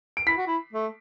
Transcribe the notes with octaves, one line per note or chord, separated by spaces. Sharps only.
D7
E4 B6
F#4
E4
A3